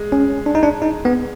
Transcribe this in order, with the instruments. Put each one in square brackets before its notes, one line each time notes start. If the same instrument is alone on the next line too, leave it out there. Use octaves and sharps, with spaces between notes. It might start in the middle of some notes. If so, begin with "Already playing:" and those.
Already playing: [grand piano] G#3
[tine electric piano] C#4
D4
D#4
D4
D#4
B3